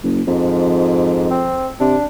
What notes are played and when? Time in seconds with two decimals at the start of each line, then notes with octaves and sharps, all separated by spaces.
0.03 F#1
0.28 F2 G#2
1.31 C4
1.80 C3 D4